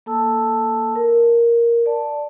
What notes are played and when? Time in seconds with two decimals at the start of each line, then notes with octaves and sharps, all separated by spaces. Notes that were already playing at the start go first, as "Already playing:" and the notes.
0.06 A#3 A4 A5 E6
0.96 A#4
1.86 D5 A5